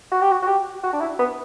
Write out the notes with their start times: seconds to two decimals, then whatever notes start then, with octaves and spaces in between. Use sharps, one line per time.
0.11 F#4
0.21 G4
0.31 F#4
0.42 F#4
0.47 G4
0.83 F#4
0.93 D4
1.00 E4
1.19 B3